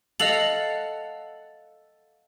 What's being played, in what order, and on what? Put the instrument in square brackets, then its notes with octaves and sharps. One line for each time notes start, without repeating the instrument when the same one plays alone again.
[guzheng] A4 F5 F#5 [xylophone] D#5 F7 F#7